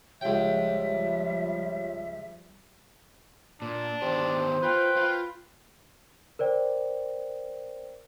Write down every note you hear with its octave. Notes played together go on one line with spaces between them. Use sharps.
C#2 F3 G3 G4 C#5 E5 G5
A#2 D4
D#3 B3 G4 C5
F4 B4 G5
F4
A#4 C5 D5 G5